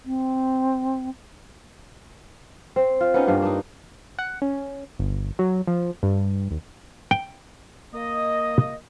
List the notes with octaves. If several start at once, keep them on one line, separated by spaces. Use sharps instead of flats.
C4
C4
F4
B3 C#4 D#4
G2 A#3 C#4 D4
D4 D#4
F#5
C#4
G1
F#3
F3
G2
D#2
G5
A#3 D#5